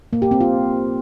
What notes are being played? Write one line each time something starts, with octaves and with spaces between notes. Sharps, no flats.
A#3
G4
C4
F4